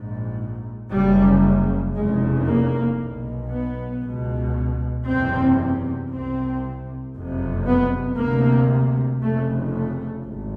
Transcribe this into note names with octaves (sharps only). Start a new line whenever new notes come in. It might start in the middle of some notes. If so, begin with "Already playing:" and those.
Already playing: A#1 G#2
F#1 F#2 C#3 G3
F1 E2 C#3 G#3
A#3
B1 B2
B3
C#2 B2
F#1 E2 C3 C4
C2 C3 C4
F#1 F2 C3
B3
D2 C3 A#3
F1 F2 C#3 A3
A3
G#1